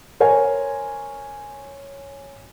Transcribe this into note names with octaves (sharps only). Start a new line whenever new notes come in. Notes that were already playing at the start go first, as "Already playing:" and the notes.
A#4 C5 C#5 G#5